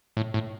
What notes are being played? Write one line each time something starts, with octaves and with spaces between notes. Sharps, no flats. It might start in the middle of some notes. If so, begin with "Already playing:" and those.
A2
A2